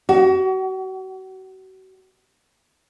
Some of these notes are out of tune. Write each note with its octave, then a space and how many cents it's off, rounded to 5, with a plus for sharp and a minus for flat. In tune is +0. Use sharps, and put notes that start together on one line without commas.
F#4 +35